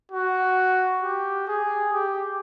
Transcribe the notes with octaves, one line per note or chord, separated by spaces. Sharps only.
F#4
G4
G#4
G4